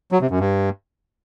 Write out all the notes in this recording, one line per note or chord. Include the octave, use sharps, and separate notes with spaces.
F#3
C3
F#2
G2